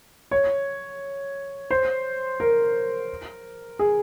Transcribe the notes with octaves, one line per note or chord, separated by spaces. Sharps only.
C#5
C5
A#4
G#4